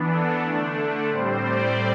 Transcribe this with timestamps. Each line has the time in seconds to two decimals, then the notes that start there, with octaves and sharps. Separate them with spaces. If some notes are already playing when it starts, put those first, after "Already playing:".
Already playing: E3 B3 D4
0.08 A4
0.43 D3 A3 D4
1.09 A2 G3 C4 C5
1.44 D5